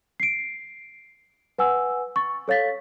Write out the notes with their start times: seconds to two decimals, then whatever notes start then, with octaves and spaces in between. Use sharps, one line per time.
0.20 C7 D7
1.58 B4 F#5 G#5 E6
2.16 C#6 A6
2.48 A4 C#5 F5 A6 B6